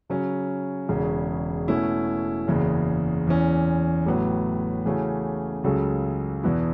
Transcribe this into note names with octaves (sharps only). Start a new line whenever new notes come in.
C#3 F#3 C#4
E1 E2 C#3
B2 A3 C#4 E4
F#1 E2 C#3
E2 E3 C#4
A1 A2 F#3 B3
C#3 E3 A3 C#4 F#4
C#2 C#3 F#3 C#4 A4
E2 B2 B3 E4